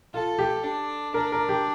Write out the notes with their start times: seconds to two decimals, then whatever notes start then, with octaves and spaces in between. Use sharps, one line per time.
0.14 F4 A4
0.38 G4
0.64 D4
1.14 D4 A#4
1.32 A#4
1.49 G4